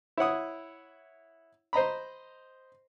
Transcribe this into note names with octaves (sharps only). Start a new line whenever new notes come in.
E4 C#5 F#5 D#6
C5 D#5 A#5 B5